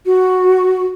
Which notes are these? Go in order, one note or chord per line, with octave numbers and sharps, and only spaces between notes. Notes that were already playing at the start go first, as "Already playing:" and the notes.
F#4